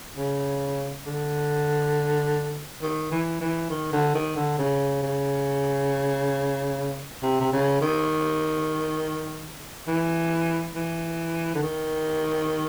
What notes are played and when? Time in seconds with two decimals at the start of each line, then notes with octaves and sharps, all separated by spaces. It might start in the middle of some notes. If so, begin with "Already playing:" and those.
0.17 C#3
1.06 D3
2.82 D#3
3.11 E3
3.40 E3
3.70 D#3
3.93 D3
4.14 D#3
4.36 D3
4.58 C#3
5.03 C#3
7.22 C3
7.40 C3
7.52 C#3
7.81 D#3
9.87 E3
10.75 E3
11.55 D3
11.63 D#3